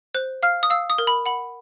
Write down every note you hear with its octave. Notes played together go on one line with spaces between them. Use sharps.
C5 F#6
F5 F6
D#6
F5 E6
D#6
A#4
B5
F#5 B5